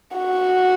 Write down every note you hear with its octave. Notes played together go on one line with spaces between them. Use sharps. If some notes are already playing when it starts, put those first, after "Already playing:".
F#4